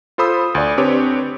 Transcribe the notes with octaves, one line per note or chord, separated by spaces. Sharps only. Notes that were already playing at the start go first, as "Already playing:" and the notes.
F4 A4 C5 B5 D#6 E6
D2 D5
C4 D4 G4 B4 C#5